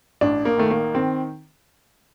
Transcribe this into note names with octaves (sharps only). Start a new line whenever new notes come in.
A1 D4
A#3
D#3 A3
A#3
D#3 C4